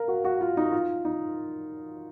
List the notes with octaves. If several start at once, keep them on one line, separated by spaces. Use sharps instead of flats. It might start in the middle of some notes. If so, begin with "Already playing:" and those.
Already playing: A#4 F5
F#4
F#4
F4
D#4
F4
D#4